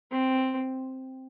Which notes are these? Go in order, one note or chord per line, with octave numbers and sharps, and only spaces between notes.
C4